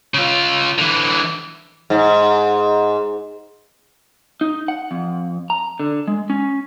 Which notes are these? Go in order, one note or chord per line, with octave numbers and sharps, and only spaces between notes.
C#3 F4
D3 E3
G#2
D#4
F#5
F2
A#5
D3
G#3
C#4